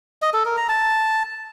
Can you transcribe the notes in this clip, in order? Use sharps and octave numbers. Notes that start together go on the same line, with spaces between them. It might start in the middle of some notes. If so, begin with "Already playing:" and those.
D#5
A4
A#4
A#5
A5